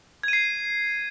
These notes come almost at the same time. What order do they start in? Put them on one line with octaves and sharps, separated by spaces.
G#6 D#7 C7